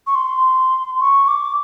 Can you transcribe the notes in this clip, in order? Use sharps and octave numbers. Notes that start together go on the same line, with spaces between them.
C#6
C6
C#6
D6